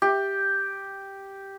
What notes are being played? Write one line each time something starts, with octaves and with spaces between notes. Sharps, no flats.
G4